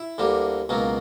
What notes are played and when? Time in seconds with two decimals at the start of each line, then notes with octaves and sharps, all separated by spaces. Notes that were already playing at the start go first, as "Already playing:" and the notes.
Already playing: E4
0.18 D2 D3 G3 A#3
0.69 C#2 B2 F#3 A#3